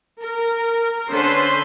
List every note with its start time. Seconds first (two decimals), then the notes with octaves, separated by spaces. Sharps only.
0.21 A#4
1.09 D3 C#4 A4 B4 C5 C6